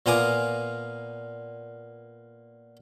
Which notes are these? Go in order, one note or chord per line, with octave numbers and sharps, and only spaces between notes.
A#2 B3 F4 G#5 A#5 D6